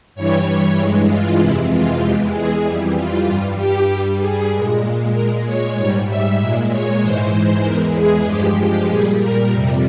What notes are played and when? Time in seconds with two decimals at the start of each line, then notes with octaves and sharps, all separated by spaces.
0.15 G2 E3 G3 C#5
0.78 G2 E3 G#3
1.09 F4
1.40 F2 C3 E3 G#3 E4
1.71 F4
2.02 E2 E3 G#3 G4
2.34 G#4
2.65 F2 E3 G3
2.97 F4
3.27 G2 F4
3.32 G3
3.59 G4
3.90 G2 G3
4.20 G#4
4.51 G#3
4.57 A#2
5.14 A#2 G#3 A#4
5.46 C#5
5.76 G#2 G3 C#5
6.07 E5
6.39 A#2 G#3 E5
6.71 C#5
7.01 G#2 E3 G#3 C5
7.63 E2 E3 G#3 A#4
7.95 G#4
8.26 G2 F3 G#3 G4
8.88 A#2 G3 G#4
9.20 A#4
9.51 F2 C3 G3